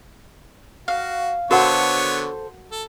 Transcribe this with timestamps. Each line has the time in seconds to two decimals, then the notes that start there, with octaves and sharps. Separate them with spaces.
0.88 F#4 F5
1.51 D3 B3 F#4 A4 A#4 C5 C#5 F#5
2.72 A4